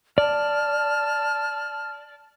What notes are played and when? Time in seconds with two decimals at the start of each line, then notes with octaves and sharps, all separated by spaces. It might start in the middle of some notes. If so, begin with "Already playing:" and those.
0.18 D5 A5 F6